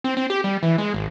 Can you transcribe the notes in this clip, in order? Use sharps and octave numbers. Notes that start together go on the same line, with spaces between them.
C4
C4
G4
G3
E3
G#3
G#1